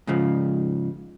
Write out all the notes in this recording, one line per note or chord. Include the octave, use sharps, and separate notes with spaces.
G#2 C#3 F3